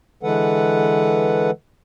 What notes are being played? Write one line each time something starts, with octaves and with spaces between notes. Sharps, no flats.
D3 E3 G#3 A4 B4 F#5